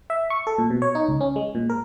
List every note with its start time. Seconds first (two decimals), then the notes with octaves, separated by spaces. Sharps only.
0.10 E5
0.30 C#6
0.47 A4
0.58 A#2
0.70 B2
0.82 C#5
0.95 D#4
1.09 C#2
1.21 C#4
1.36 G#3
1.55 A#2
1.70 A#4